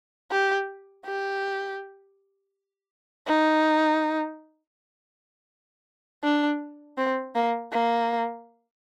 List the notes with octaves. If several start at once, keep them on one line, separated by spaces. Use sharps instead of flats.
G4
G4
D#4
D4
C4
A#3
A#3